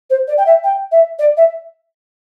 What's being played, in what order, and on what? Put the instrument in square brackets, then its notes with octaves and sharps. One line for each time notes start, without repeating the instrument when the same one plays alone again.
[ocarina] C5
D5
G5
E5
G5
E5
D5
E5